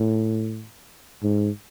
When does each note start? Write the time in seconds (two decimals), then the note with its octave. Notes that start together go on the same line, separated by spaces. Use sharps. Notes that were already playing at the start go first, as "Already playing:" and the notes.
Already playing: A2
1.23 G#2